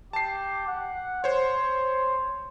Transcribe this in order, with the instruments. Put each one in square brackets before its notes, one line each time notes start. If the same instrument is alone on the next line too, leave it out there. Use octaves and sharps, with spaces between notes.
[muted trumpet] G4 [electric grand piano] A5 C7
[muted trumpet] F#5
[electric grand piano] C5 C#5 [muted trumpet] C6